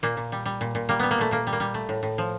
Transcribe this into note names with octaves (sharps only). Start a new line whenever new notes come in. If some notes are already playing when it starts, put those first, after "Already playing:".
A#2 A#3
A#2
G3
G3
A#2
A#2
G3 A#3
G3 B3
A#3
A#2 A3
A#2 A#3
G3
A#3
G3
A3
A2
A2
F3